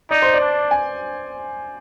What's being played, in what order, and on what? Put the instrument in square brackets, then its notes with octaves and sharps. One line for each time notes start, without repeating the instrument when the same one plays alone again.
[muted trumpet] D#4 [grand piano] D5
[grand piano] C5
D5
[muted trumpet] D4
[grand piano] G#5